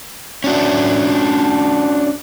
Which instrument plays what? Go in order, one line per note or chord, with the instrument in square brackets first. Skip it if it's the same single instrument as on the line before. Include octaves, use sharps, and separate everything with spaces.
[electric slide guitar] C#4 D4 F#4